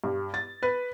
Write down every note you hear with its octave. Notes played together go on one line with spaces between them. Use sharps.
G2
A6
B4